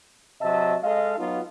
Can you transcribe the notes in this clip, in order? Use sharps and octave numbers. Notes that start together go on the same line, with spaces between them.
C3 F#3 D#5 E5 A5
G#3 A4 D#5 F5
F#3 B3 D#4 F4